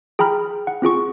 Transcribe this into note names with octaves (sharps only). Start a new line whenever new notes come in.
G#4 G5 A#5 B5 F6
F#5
C4 F4 G#4 C#6